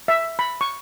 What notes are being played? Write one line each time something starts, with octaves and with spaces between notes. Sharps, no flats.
E5
B5
C#6